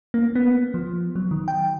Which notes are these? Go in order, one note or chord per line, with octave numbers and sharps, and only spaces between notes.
A#3
B3
F3
F#3
D#3
G5